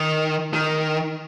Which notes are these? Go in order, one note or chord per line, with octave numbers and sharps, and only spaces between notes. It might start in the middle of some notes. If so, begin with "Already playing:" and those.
Already playing: D#3
D#3